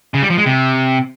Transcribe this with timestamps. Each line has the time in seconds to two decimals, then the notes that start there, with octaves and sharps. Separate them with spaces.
0.14 C#3
0.22 G3
0.30 F3
0.38 G#3
0.46 C3